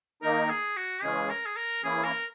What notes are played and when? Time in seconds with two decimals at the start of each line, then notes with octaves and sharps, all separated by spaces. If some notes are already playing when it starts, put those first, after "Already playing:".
0.22 D#3 A#3 D#4 A#4
0.49 G#4
0.77 F#4
1.03 C#3 E3 G#3 C#4 G#4
1.30 A#4
1.46 G#4
1.56 A#4
1.84 E3 A#3 C#4 E4 G#4
2.04 A#4